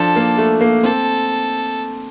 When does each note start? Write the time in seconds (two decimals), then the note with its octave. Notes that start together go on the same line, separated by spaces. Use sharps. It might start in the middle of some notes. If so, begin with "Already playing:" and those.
Already playing: F3 D4 A4
0.16 A#3
0.38 A3
0.61 A#3
0.83 C4 A4